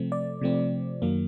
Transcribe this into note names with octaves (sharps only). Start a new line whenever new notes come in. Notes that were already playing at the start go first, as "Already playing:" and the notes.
Already playing: C3 F3 A3 C4
D5
C3 F3 A3 C4
F#2 D#3 F#3 A#3